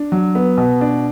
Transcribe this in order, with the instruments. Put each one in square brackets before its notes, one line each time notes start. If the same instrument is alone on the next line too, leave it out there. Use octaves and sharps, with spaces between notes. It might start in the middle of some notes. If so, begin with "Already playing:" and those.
Already playing: [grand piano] D4
F#3
B3
B2
D4